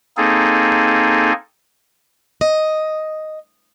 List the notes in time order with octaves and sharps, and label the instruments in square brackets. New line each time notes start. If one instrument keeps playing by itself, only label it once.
[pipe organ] A#3 C4 D#4 G#4 A4
[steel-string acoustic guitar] D#5